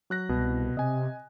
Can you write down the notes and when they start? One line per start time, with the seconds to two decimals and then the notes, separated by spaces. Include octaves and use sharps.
0.10 F#3 F#6 A#6
0.29 C2 B2
0.77 C3 D#5 G#5